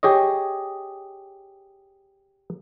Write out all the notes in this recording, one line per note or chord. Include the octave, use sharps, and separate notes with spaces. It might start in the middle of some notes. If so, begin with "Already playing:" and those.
G4 G#4 C#5 D#5